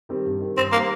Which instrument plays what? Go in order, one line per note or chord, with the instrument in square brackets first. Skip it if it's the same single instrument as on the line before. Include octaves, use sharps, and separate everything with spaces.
[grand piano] D#3 G3 C4 G4
G2
D#3 G3
[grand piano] G2 [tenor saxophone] C4
[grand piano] D#3 G3 [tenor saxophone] A#3